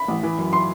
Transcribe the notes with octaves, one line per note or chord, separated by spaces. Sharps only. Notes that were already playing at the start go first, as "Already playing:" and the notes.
Already playing: B5
A1
E3
F#2
C6